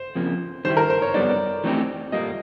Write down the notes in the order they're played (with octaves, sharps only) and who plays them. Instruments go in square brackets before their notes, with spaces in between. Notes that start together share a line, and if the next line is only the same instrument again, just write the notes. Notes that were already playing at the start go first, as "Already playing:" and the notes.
Already playing: [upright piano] C5
[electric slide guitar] F2 C#3 F3 A#3
[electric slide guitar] D#3 G3 B3 E4 G4 [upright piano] C5
[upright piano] A#4
C5
C#5
[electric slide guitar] G3 B3 D#4 [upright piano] D5
[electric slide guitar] E3 A3 C4 D#4 G4
[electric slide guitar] A#2 G3 A#3 [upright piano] D#5